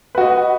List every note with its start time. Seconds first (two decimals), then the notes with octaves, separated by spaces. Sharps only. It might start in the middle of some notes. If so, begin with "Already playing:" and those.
0.15 B4
0.18 F#4
0.21 D#5